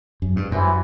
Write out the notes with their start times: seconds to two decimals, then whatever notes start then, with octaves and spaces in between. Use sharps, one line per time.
0.22 F#2
0.36 G2
0.51 C2 F#2 C3 E3